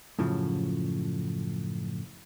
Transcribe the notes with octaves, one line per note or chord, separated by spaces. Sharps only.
F#2 A2 C#3 F3